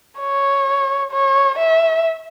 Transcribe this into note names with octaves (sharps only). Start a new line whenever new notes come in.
C#5
C#5
E5